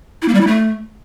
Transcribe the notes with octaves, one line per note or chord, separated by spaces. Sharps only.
E4
A#3
G3
E4
A3